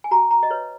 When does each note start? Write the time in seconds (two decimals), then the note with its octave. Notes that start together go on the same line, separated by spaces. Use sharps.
0.04 G#5
0.11 F#4 A#5
0.31 A#5
0.43 D#5
0.50 B4 C#5